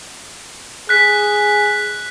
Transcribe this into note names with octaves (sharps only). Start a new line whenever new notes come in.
G#4 F#6 B6